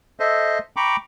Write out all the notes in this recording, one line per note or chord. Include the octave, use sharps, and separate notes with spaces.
A4 C5 D#5 E5
G5 A#5 B5 C#6 D6